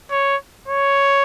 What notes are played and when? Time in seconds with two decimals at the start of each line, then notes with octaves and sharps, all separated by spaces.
0.11 C#5
0.68 C#5